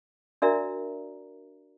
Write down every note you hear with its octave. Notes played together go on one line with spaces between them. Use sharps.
D4 F#4 A#4 D5 E5 A#5